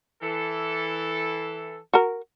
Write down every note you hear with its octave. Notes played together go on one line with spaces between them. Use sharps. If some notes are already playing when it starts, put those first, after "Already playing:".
E3 A4
F#4 A#4